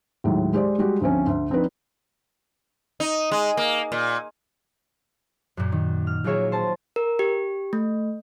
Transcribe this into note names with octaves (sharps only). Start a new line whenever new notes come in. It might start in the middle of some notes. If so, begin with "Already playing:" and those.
D#2 A2 F#3 G#3
G#3 G4 C5 D5
G3 G#3 F#4 G4
D2 F3 C4 C#4
D2
F3 C4 D4 D#4 B4
D#4
G#3
A#3
A#2
F#2 A#2
D#3
F6
F#3 A#3 F4 G#4 C#5 E5
C5 A5
A#4
G4
A3